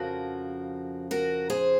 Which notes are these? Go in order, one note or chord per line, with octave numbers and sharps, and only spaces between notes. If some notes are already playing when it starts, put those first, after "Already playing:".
Already playing: F2 C#3 F3 F#4 A#4
F#4 A#4
G#4 C5